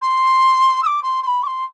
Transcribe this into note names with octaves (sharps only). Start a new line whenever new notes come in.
C6
E6
D6
C6
C6
B5
D6
C6